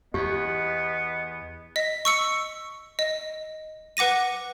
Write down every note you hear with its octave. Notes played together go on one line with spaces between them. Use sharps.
E2 B3 G4 D#5
D#5 B6
C#6 E6 C#7
D#5
B4 F#5 D6 A#6 D#7